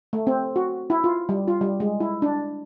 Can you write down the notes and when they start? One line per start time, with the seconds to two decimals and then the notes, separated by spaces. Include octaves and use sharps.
0.13 A3
0.27 C4
0.56 F#4
0.90 E4
1.04 F4
1.29 G3
1.48 F4
1.61 G3
1.80 G#3
2.00 E4
2.22 D4